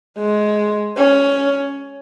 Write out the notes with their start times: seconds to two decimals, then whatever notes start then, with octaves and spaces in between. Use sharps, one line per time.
0.18 G#3
0.97 C#4